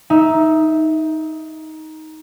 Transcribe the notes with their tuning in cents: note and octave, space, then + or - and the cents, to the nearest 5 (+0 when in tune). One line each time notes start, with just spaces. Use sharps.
D#4 +10 E5 -10